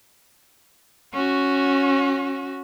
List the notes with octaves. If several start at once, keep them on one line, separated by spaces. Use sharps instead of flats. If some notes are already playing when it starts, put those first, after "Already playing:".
C#4 F#4